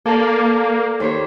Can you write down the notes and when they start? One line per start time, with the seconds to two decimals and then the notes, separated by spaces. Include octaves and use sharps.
0.06 A#3 A4 D5
1.00 D#2 C5 C#5